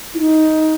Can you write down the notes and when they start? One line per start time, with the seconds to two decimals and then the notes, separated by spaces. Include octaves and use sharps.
0.14 E4
0.19 D#4